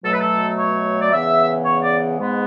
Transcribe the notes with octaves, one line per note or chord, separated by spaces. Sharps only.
B2 F#3 A3 A4
B4
A4
C#5
D5
E2 C#3 E3 B3 E5
C#5
D5
G#2 G#3 B3